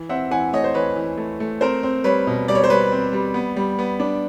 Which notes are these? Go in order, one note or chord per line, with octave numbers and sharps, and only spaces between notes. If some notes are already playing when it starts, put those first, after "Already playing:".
Already playing: E3
C4 E5 F#5
E3 F#5 G#5
A3 C#5 D#5
C5
E3 B4 C#5
E3
A3
A3
C4 A#4 C5
C4
G3 B4 C#5
B2
G3 D5
C#5
C5
G3 B4 C#5
C4
G3
B3
G3
B3
D4